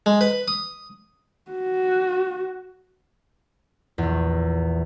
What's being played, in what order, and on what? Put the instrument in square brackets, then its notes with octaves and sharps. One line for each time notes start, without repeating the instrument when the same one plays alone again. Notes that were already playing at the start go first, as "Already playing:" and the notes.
[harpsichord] G#3
B4
D#6
[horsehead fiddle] F#4
[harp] A#1 E2